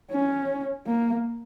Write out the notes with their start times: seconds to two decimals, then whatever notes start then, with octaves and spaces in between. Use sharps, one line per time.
0.11 C#4
0.87 A#3